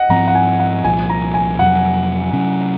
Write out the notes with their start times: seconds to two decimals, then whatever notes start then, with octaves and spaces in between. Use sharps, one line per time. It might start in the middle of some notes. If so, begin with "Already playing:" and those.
Already playing: D#5 F#5
0.09 G#2 F3 C4 A#5
0.28 F#5
0.35 G#5
0.60 F#5
0.84 C2 A#2 F3 G#5
1.10 A#5
1.34 G#5
1.59 F2 C3 F#3 F#5
2.33 C3 F#3 C#4